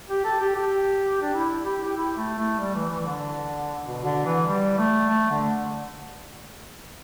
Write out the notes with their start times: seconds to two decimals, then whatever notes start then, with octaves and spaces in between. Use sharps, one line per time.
0.09 G4
0.24 A4
0.40 G4
0.55 G4
1.22 D4
1.33 E4
1.65 G4
1.84 G4
1.96 E4
2.17 A3
2.38 A3
2.59 G3
2.75 E3
2.89 E3
2.99 E3
3.06 D3
3.84 B2
4.04 D3
4.25 E3
4.46 G3
4.78 A3
5.09 A3
5.30 D3